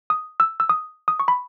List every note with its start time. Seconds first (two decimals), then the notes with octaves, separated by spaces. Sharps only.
0.10 D#6
0.40 E6
0.60 E6
0.69 D#6
1.08 D#6
1.20 C#6
1.28 B5